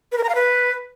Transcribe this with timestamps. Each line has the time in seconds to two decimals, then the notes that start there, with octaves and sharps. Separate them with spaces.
0.12 B4
0.18 A#4
0.24 A#5
0.29 F5
0.35 B4